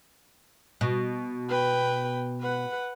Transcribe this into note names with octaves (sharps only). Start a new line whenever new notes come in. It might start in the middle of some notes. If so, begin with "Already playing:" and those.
B2
B4 G5
B4 F#5